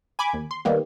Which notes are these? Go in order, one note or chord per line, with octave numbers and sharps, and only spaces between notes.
G#5 B5 D6 G#6
D#2
C6
D#3 G3 A#3 B3